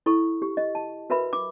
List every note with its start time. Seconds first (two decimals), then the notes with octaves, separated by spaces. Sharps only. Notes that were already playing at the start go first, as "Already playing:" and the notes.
0.06 E4 A4 C#6
0.42 G4
0.57 D#5
0.75 A5
1.10 F#4 A#4 B4 E5 B5
1.33 D6